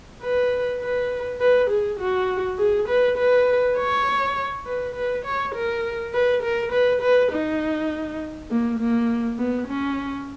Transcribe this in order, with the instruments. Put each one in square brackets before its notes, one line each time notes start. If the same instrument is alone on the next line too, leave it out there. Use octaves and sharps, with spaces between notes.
[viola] B4
B4
B4
G#4
F#4
G#4
B4
B4
C#5
B4
B4
C#5
A#4
B4
A#4
B4
B4
D#4
A#3
A#3
B3
C#4